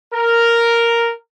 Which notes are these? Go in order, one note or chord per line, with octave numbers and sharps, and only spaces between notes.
A#4